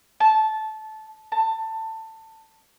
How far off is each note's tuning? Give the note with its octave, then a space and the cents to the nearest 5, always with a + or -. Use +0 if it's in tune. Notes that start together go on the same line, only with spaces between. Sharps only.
A5 -15
A5 +20